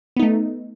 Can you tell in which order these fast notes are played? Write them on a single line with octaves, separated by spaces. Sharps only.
B3 D#4 A3